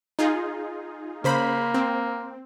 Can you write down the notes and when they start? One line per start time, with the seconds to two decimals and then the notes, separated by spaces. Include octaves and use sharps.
0.19 D#4 F4 G#4
1.24 C#3 A#3 C5 B5
1.74 C4